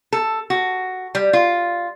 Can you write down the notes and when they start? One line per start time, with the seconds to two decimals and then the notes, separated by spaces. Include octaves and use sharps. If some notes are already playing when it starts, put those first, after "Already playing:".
0.13 A4
0.50 F#4
1.15 G3
1.33 F4